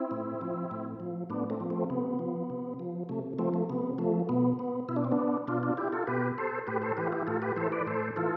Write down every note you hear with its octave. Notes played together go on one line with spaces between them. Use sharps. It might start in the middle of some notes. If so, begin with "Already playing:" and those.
Already playing: C4 E4
A2
F3
A2
F3
A2 B3 D4
A3 C4
F3
A3 C4
C3 B3
F3
C3
F3
C3 A3
F3 A3 C4
A3
C3 B3
F3 A3
B2 B3
B3
B2 E4
D4
C4
B3 D4
B2 D4 F4
D4 F4
E4 G4
F4 A4
B2 G4 B4
A4 C5
A2 G4 B4
A4 C5
E3 G4 B4
F4
E4 G4
A2 F4 A4
G4 B4
E3 A4 C5
B4 D5
A2 A4 C5
E3 F4 A4